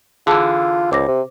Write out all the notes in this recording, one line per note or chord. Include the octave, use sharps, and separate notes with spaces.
D3 E3 F4 G#4 A5
C#2 C5 D6 A#6
C3